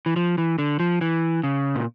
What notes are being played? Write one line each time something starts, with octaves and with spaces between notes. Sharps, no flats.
E3
F3
E3
D3
F3
E3
C#3
A#2